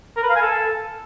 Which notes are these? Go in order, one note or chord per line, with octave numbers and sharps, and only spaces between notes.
A#4
B4
F5
G#5
A4